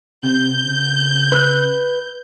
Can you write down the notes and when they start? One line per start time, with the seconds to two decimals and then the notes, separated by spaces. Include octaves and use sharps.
0.23 C3 G6
0.65 C#3
1.32 B4 E6 F#6